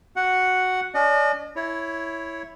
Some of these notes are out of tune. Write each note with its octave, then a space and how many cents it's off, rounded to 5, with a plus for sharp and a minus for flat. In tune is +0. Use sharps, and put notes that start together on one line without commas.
F#4 +0 F#5 +0
D4 -45 D#5 -40
E4 +0 C#5 +0